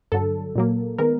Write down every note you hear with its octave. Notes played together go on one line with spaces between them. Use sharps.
G2 D3 F#3 A4
A#2 F#3 A#3
D#3 G#3 B3 A#4